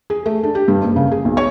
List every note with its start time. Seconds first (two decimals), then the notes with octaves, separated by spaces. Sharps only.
0.10 G#4
0.26 A3
0.43 D4
0.55 G4
0.68 G2
0.81 F#1
0.96 C#3
1.12 G#4
1.25 B1
1.37 C#5